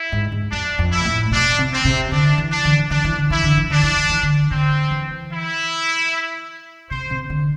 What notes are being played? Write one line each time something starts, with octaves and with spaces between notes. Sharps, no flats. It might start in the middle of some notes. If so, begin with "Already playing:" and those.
Already playing: E4
G#2
G#2
F2 D4
F2
E4
B2
A2
B2 D4
C3
C4
C3
D3 D4
E3
D4
D3
E3
D3 D4
E3
D3
E3 E4
D3
E3
D3 D4
E3
D3
E3
D3
D3 C4
E3
E4
C3 C5
C3
D3